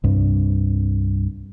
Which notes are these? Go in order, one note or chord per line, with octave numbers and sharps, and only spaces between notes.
C2 G2